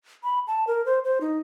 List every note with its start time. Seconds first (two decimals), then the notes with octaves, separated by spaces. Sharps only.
0.23 B5
0.47 A5
0.67 A#4
0.86 C5
1.04 C5
1.21 D#4